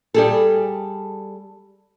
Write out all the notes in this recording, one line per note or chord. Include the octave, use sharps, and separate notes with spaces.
G3 G#4 A4